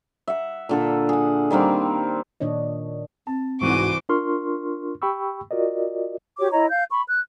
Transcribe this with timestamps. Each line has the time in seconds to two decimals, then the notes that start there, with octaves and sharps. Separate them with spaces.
0.28 E5 F#5
0.69 A#2 D3 A4
1.09 G#4 F#5
1.51 D#3 G3 A#3 C4
2.40 A#2 D#3 D4 C#5 D#5
3.27 C4 A5
3.61 C2 G#2 E3 F#4 C5 C#6 D6 D#7
4.09 D4 F4 A#4 C6 C#6 F6
5.02 G4 G5 B5 C#6 E6
5.51 F4 F#4 A#4 D5 D#5
6.39 F#4 G4 C#5 D6
6.51 E4 C#5 D#5 A#5
6.69 F5 G6
6.92 B5 C#6
7.08 F#6